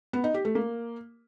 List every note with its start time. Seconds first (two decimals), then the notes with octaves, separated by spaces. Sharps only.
0.13 B3
0.24 D#4
0.34 G4
0.45 A3
0.55 A#3